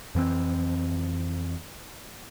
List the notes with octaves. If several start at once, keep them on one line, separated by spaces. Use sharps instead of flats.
F2 E3 A#3 C4